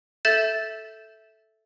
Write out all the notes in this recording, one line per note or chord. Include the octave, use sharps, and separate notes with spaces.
A4 E5 G6 A6 E7